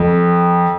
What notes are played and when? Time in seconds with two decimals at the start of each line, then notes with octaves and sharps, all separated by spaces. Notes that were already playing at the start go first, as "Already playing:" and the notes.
Already playing: F2